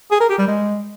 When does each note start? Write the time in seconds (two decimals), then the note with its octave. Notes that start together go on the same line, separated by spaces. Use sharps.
0.11 G#4
0.20 A#4
0.29 G4
0.38 G3
0.48 G#3